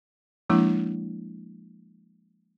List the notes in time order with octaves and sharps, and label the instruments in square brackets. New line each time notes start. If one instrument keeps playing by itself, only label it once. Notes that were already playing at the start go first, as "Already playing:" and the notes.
[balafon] F3 G#3 A#3 D4 E4